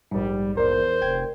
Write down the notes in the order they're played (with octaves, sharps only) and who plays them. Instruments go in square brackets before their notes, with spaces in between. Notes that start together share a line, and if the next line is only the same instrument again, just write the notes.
[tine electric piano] A#1 G#2 [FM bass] G3
[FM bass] E2 [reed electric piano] A#4 D5 [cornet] C5
[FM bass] F1 [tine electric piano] G5 G#6